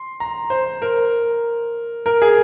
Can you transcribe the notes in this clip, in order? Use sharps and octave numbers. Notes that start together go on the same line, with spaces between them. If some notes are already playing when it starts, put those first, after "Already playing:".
Already playing: C6
A#5
C5
A#4
A#4
G#4